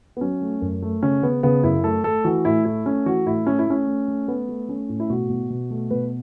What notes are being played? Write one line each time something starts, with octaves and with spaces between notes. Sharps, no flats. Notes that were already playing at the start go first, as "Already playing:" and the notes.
B3
F#3 C#4
A3
F#2
A3
C#3 C#4
C#3 B3
C#3 B3
F#2 E4
A3 A4
A3 A4
E3 F#4
A2 E4
A3 E4
A3 C#4
E3 F#4
A2 E4
A3 C#4
E4
A3 C#4
A3
A3
A3 B3
A3
A3 C#4
A2
E4
B2 F#4
B2
B2
A3
B2 B4